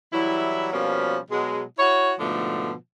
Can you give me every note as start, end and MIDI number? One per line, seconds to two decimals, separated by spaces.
0.13 0.68 52
0.13 0.68 54
0.13 0.68 55
0.13 0.68 64
0.73 1.17 47
0.73 1.17 53
0.73 1.17 55
0.73 1.17 58
0.73 1.17 61
1.31 1.62 47
1.31 1.62 54
1.31 1.62 56
1.78 2.13 64
1.78 2.13 66
1.78 2.13 73
2.19 2.72 44
2.19 2.72 47
2.19 2.72 50
2.19 2.72 53
2.19 2.72 57